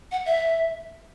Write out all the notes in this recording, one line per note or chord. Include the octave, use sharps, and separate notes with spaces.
F#5
E5